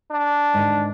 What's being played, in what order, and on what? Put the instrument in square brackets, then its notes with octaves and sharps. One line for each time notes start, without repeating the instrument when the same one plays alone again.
[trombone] D4
[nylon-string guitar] G#2 D3 D#3